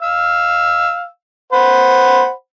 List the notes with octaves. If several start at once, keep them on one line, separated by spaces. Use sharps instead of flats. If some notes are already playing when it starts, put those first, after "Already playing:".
F5 E6
C5 F#5 B5